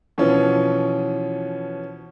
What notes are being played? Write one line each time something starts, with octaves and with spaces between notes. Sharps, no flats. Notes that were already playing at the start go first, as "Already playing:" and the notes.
B2 E3 F3 C#4